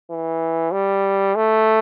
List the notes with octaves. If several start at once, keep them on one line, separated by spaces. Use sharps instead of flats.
E3
G3
A3